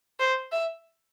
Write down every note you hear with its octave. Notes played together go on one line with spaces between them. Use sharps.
C5
E5